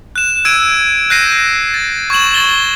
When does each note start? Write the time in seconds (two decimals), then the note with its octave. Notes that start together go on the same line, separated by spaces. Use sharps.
0.16 F#6 E7
0.45 E6 G#6 D7 D#7
1.10 F#6 G6 A#6 C7 D#7
1.74 A6
2.10 C#6 G#6 E7 F#7
2.34 C#6 A6 G7